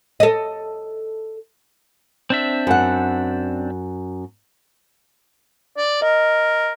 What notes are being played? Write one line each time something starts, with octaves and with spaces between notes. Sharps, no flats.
A4 D#5
C4 D4 E5
F#2 F#5
D5
A#4 D#5